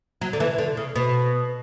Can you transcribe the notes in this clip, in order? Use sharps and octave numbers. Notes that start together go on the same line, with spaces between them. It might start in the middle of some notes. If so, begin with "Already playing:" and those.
F#3
D3
E3
D3
C#3
B2